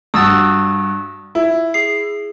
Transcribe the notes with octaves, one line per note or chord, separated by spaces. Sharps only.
G2 F#4 D#6 E6 A6
E4
G#4 C7